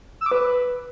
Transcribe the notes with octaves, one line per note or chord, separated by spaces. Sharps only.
E6
D6
B4